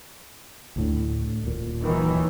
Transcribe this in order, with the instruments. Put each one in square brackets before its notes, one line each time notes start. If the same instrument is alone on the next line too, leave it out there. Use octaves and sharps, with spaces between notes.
[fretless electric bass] D2 A2 D3
D#1 D#2 A#2
[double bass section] D#3 E3 F#3